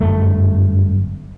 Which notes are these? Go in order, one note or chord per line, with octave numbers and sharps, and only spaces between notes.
G1 F#2 A3